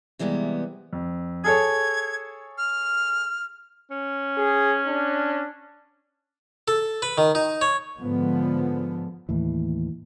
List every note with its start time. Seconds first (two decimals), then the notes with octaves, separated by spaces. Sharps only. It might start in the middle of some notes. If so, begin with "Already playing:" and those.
0.19 C3 E3 G3 G#3 B3
0.93 F2
1.44 G#4 A4 C#5 G#6
2.58 F6
3.91 C#4
4.38 G#4
4.88 D4
6.68 A4
7.02 B4
7.18 D#3
7.35 D#4
7.61 C#5
7.98 G#2 D3 F3 B3
9.29 D#2 A2 E3